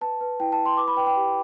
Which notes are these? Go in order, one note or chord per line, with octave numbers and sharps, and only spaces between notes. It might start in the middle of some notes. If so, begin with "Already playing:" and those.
B4 A5
B4
E4 G5
A5
E4
C6
B4 D6
B5
B4 G5
G5
G4